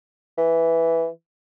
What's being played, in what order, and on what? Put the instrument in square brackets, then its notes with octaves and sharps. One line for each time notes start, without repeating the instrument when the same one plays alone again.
[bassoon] E3